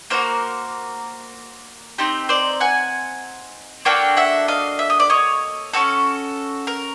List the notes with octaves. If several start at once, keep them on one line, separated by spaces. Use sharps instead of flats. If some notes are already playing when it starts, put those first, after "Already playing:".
A#3 D#4 F#4 A#4 C5
C4 D#4 G4
C5 D5
F#5 G#5
A#3 D4 F#4 A4 F5 G5
E5 F#5
D#5 F5
E5
D#5
D5
C#5 D#5
C#4 F#4 A4
A#4